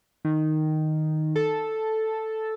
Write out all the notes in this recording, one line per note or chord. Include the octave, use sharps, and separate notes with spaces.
D#3
A4